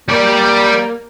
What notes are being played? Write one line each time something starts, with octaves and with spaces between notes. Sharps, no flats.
G3 A#3 D5